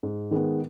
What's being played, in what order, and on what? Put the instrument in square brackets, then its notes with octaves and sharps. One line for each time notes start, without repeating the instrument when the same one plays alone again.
[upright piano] G#2
D#3 G#3 B3